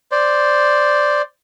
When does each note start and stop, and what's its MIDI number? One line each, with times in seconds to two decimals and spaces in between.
0.12 1.22 72
0.12 1.22 74